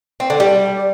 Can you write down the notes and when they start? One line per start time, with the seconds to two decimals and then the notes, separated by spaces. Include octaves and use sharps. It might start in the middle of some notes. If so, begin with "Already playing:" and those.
0.20 C4
0.30 D3
0.40 G3